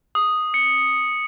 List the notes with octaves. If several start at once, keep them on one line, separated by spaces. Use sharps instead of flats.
D#6
C#7